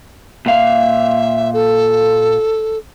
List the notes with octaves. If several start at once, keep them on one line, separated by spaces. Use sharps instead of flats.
A#2 E5 F5
A4